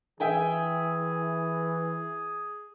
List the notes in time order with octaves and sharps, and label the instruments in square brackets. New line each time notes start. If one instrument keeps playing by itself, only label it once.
[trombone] E3 [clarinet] G#4 [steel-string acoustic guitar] E5 G5 G#5